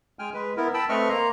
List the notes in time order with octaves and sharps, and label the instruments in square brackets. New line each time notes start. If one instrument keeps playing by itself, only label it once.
[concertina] G#3 G5 G#5 F6
G#3 B4
B3 E4 A#4
G5 A5 B5 E6
A3 C4 B4 D#5 C#6 F6
A#3 A#5 C6